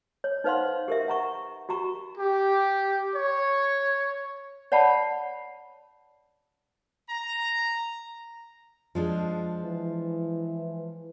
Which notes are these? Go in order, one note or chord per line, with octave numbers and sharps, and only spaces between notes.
C#5
D#4 B4 C5 F5 F#5 C6
G4 A#4 E5
F#5 A#5 C#6
F#4 G4 A#5 C#6
G4
C#5
C#5 D5 F#5 A5 B5
A#5
F3 G#3 D4
E3